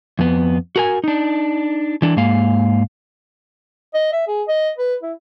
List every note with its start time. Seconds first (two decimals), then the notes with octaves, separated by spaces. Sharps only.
0.19 F2 B3
0.76 F#4 A#4 G#5
1.04 D4 D#4
2.02 E3 D4
2.16 G#2 A#3 F5
3.94 D#5
4.13 E5
4.27 G#4
4.48 D#5
4.78 B4
5.03 E4